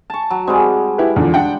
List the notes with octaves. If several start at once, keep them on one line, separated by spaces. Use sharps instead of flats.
A5 C#6
F#3
G3 G#3 C4
E4 G4 B4
E2 D3 F3
D4 F#5 G5